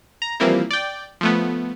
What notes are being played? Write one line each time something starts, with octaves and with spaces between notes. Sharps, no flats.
A#5
E3 F3 G3 A#3 C4 E4
D5 G5
F3 A3 B3